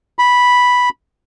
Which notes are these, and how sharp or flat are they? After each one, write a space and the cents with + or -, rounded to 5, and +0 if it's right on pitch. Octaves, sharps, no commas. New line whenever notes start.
B5 -5